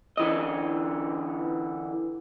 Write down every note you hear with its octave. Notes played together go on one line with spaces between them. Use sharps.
D3 E3 D#5